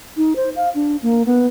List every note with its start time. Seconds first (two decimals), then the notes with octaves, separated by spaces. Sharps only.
0.17 D#4
0.36 C5
0.56 F5
0.75 D4
1.02 A#3
1.26 B3